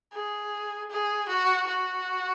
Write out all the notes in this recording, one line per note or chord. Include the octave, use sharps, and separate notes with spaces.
G#4
G#4
F#4
F#4